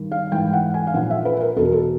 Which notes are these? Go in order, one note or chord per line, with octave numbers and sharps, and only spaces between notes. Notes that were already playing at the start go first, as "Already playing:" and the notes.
Already playing: G2 D#3
F5
G#2 E3 G5
F#5
G#5
F5
A#2 F3 F#5
E5
B4
A#4
E2 B2 A4
A#4
A4